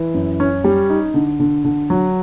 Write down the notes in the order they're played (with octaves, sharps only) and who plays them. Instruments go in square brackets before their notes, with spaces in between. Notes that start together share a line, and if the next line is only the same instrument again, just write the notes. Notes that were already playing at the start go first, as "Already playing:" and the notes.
Already playing: [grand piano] E3
F#2
C#4
G3
D#4
D3
D3
D3
F#3